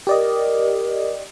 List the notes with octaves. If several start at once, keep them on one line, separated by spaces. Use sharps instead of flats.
G4 A#4 D5 D#5